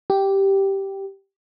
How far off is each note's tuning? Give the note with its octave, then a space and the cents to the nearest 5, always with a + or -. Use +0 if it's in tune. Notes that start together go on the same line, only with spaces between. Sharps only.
G4 -5